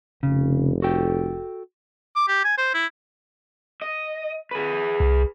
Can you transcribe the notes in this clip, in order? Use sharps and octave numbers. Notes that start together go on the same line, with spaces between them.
F1 C#3
F#4 A4 G5
D6
G4
G#5
C5
E4
D#5
G#4 B4
C2